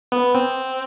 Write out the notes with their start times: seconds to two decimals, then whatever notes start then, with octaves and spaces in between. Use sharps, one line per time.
0.12 B3
0.35 C4